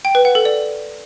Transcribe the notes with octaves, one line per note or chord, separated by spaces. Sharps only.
G5
B4
F#5
A4
D5